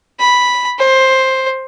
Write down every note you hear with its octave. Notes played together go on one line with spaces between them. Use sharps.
B5
C5